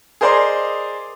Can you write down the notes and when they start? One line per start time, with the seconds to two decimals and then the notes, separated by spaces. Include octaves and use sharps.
0.21 G#4 A#4 C5 D5 D#5 C6